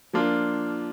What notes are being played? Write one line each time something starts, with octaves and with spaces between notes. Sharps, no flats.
F3 A#3 D4 F4